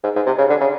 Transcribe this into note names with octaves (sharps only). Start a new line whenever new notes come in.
G#2
G#2
C3
C#3
D3
C#3